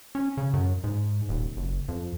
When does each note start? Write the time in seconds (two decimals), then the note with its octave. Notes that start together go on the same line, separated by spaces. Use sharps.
0.15 C#4
0.37 C#3
0.53 F#2
0.84 G#2
1.29 D#1
1.57 F#1
1.89 F2